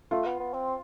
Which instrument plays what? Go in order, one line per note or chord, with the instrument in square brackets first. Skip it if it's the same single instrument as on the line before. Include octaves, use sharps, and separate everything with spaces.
[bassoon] A3 [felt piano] F4
[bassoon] B3
B3
C4